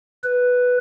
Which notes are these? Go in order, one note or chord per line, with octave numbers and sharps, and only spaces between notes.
B4